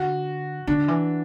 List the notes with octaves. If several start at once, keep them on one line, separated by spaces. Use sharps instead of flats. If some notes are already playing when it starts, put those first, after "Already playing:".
Already playing: D3 F#4
D3 D4
E3